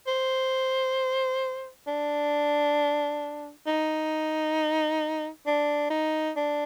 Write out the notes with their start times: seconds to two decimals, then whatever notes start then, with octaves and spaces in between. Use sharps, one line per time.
0.07 C5
1.87 D4
3.67 D#4
5.46 D4
5.90 D#4
6.36 D4